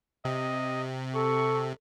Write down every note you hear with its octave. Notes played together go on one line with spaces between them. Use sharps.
C3 D#5
A4 C#6